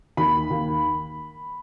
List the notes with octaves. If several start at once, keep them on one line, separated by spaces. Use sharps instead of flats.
D#2 B5
D#2